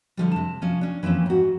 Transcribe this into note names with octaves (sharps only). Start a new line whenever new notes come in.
D3 F3 G3
C3 A5
F3 C#4
C#4 D4
E3 F3 A#3 C4 C#4
G#2 F#4